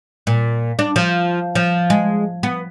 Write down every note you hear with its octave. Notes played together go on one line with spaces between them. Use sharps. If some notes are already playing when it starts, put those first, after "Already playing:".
A#2
D4
F3
F3
G#3
B3